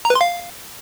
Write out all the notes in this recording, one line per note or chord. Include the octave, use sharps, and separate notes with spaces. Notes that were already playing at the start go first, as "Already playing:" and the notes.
A#5
B4
C6
F5